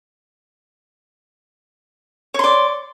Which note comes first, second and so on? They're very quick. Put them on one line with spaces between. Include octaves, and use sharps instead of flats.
C#5 C6 D5